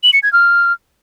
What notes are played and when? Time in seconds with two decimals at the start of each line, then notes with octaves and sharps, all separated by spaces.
0.03 F#7
0.13 C#7
0.23 G#6
0.33 F6